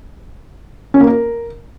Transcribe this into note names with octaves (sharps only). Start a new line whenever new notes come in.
C#4
A#3
A#4